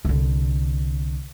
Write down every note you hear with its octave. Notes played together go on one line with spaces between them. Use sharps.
C2 D3